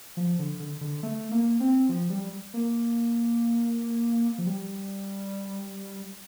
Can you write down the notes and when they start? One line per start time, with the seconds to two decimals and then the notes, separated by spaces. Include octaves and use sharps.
0.17 F3
0.39 D3
0.59 D3
0.81 D3
1.03 A3
1.31 A#3
1.60 C4
1.89 F3
2.10 G3
2.54 A#3
4.38 F3
4.47 G3